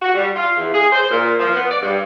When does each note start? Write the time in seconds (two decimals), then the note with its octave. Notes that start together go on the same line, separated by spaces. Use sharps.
0.02 F#4
0.14 G3
0.35 F4
0.57 E2
0.74 G#4
0.93 C5
1.11 A#2
1.39 F3
1.54 B3
1.70 D5
1.82 G2